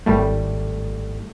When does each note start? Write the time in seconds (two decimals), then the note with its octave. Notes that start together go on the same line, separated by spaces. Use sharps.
0.06 G#1 A2 G3 A3